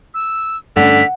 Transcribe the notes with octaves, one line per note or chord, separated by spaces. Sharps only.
E6
G2 D3 A3 C#4 F#5 B6